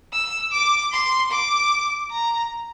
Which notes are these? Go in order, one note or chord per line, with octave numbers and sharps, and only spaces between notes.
E6
D6
C6
D6
A#5